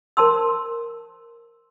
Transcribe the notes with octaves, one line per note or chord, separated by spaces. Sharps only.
A#4 C5 A5 C6 E6